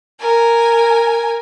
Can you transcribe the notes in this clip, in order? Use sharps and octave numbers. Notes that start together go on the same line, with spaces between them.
A#4 G#5